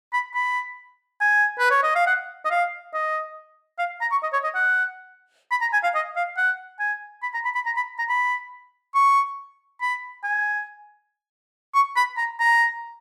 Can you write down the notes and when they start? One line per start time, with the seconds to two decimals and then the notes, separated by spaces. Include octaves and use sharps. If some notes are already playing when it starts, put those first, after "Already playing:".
0.13 B5
0.34 B5
1.21 G#5
1.59 B4
1.71 C#5
1.83 D#5
1.95 F5
2.07 F#5
2.45 D#5
2.50 F5
2.94 D#5
3.79 F5
4.01 A#5
4.12 C#6
4.23 D#5
4.33 C#5
4.44 D#5
4.55 F#5
5.51 B5
5.61 A#5
5.73 G#5
5.83 F5
5.95 D#5
6.16 F5
6.37 F#5
6.80 G#5
7.23 B5
7.34 A#5
7.45 B5
7.55 B5
7.66 A#5
7.76 B5
7.98 A#5
8.09 B5
8.95 C#6
9.81 B5
10.24 G#5
11.75 C#6
11.96 B5
12.17 A#5
12.40 A#5